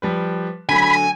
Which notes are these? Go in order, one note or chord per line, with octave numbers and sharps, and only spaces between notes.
F3 G3 B4
D3 F#3 A3 G#5 B5